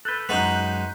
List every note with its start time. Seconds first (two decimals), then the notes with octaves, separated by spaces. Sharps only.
0.05 A4 B4 F#6 G6
0.29 F#2 G#3 D#4 F#4 B4